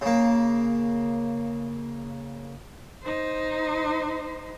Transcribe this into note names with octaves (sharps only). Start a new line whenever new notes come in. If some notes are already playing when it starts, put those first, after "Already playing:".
C#3 A#3
D#4 C5